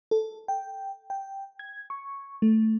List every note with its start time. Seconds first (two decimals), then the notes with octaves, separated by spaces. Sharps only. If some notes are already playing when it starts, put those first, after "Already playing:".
0.11 A4
0.48 G5
1.10 G5
1.59 G#6
1.90 C#6
2.42 A3